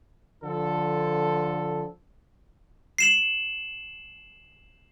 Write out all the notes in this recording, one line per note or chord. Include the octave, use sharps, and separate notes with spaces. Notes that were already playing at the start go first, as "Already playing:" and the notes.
D3 F3 A4
C7 E7 F#7